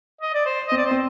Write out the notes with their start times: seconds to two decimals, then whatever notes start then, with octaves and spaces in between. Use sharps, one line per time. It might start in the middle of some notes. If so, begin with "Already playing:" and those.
0.21 D#5
0.34 D5
0.46 C5
0.68 C4 D#5
0.77 D5
0.87 C4 C5